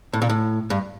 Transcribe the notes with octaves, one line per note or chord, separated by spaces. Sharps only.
A2
A#2
A2
G2